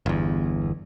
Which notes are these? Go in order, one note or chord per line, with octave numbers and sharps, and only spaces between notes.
G1 E2